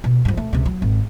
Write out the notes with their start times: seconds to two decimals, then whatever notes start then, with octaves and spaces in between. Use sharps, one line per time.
0.04 B2
0.25 G2 F3
0.37 A3
0.53 C#2 C3
0.66 F#3
0.82 G#1